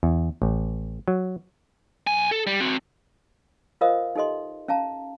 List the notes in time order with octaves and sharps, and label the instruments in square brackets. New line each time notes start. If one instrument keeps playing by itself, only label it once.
[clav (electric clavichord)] E2
A1
F#3
[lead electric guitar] B1 G#5
A4
G3
C4 F#4
[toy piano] F4 A#4 C5 D#5 F5 D#6
D#4 G4 A4 D#5 C6
C#4 F5 A5 A#5